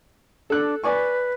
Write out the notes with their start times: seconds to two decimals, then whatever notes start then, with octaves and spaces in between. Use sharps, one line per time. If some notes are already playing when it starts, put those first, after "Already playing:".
0.50 D4 A4 F#6
0.84 B4 D5 G#5 C#6